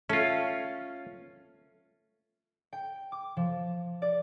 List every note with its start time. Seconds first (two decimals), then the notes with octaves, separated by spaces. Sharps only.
0.09 A3 C#4 F4
2.73 G5
3.12 D6
3.37 F3
4.02 D5